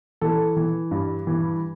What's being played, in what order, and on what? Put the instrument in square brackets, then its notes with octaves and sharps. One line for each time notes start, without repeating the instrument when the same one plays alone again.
[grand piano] E3 A4
E3
G2
E3